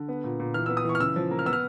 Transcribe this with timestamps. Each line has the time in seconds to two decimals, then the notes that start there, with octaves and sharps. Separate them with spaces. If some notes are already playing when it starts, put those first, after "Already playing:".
Already playing: D3
0.09 B3
0.24 A#2
0.40 A#2
0.54 E3 F6
0.66 E6
0.69 B3
0.77 D#6
0.85 E3 C#6
0.95 F6
1.00 C#3 E6
1.16 F3
1.31 A#3
1.39 F6
1.46 B3 E6
1.53 F6